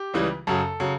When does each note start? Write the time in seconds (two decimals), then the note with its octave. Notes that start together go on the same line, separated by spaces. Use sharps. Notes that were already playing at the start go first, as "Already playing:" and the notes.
Already playing: G4
0.14 C#2 C#3 E3 G3
0.47 F#2 C#3 F#3 A4
0.80 C#3 F#3